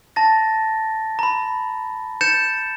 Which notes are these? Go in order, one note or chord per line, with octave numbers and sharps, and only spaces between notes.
A5 A6 A#6
A#5 B5
G6 A6 C#7 E7